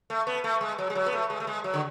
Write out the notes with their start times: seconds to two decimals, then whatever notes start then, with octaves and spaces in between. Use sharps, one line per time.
0.10 A3
0.27 B3
0.44 A3
0.61 G#3
0.78 F#3
0.90 G#3
0.95 F#3
1.06 B3
1.12 A3
1.30 G#3
1.40 A3
1.47 G#3
1.64 F#3
1.74 D3